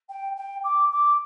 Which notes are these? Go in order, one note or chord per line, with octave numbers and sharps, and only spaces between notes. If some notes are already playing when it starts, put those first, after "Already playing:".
G5
G5
D6
D6